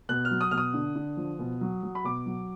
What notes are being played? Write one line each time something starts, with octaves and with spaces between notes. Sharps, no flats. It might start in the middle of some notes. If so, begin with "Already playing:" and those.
B2 F#6
F6
F#3
D#6
B2 F6
D#6
D3
D3
F3
B2
F#3
F#3
B5
B2 D6
F#3